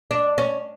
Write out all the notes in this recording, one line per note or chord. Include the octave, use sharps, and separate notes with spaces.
D4
C#4